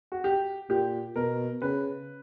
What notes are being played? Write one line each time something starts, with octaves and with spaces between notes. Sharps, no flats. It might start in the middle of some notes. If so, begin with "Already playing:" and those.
F#4
G4
A#2 G4
B2 A#4
C#3 B4